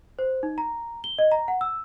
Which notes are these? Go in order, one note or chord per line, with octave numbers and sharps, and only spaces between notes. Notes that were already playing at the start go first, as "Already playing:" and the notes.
C5
D#4
A#5
G7
D#5
A#5
F#5
E6